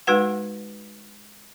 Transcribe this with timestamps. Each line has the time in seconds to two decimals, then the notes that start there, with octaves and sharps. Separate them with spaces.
0.07 G#3 D#4 F#4 B4 F#5